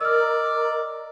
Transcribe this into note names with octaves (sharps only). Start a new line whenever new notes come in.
A#4 D5 D#5 E6 F6